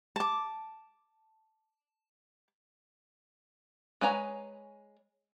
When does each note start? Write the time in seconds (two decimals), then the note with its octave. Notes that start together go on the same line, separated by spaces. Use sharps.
0.16 A5 D6
4.01 G#3 B4 C#5 G#5 A#5